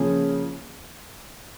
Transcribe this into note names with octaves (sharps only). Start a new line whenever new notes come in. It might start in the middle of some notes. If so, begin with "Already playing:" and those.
Already playing: C#3 F3 A#3 C#4 G#4